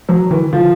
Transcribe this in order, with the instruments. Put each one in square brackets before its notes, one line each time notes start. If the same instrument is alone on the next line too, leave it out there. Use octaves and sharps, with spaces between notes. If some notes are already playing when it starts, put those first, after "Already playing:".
[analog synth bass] F3 [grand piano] F#3
[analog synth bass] D#3 [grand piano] E3
[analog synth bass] D3 [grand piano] F3